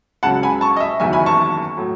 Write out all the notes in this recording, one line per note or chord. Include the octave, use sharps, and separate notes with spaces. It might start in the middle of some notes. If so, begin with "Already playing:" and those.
C#2 C#3 F#3 F#5 A5
G#5 B5
A5 C#6
D#5
E5
F#1 E2 D#3 F#3 E5 G#5
G#5 B5
A5 C#6
A2 F#3